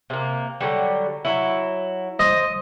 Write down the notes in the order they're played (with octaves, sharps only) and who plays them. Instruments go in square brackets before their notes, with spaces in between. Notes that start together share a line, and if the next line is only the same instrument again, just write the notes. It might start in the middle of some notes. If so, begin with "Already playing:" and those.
[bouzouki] C3 A#3
D3 F#3 G3
F#3 E4
[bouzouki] C5 [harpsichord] D#5